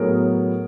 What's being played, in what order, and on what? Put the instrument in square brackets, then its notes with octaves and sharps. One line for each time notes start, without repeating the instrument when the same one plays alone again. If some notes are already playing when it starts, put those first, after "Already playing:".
Already playing: [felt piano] A2 F#3 B3 G#4 A#4